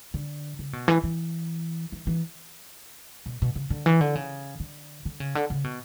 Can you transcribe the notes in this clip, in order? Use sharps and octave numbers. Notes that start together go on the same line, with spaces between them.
D3
C#3
B2
E3
E3
E3
E3
B2
B2
C#3
D3
E3
D3
C#3
D3
D3
C#3
D3
C#3
B2